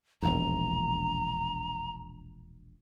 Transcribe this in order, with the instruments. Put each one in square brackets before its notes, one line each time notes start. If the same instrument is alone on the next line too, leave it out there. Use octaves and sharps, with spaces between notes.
[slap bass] E1 A#1 D#2 [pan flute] A#5